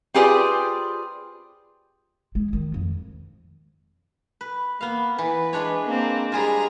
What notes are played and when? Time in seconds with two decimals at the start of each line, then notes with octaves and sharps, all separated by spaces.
0.14 C4 F4 G4 G#4 B4 D5
2.35 G#3
2.53 D#3
2.74 F2
4.41 B4
4.81 A#3 B3 F5
5.18 E3 B4
5.53 G#3 D4 C#5
5.85 A#3 C4
6.32 G3 G#3 F4 G#4 A#5